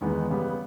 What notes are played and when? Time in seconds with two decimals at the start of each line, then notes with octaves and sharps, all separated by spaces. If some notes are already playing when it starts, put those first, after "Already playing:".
0.01 E2 D#3 G#3 B3 D#4
0.30 C#3 G3 B3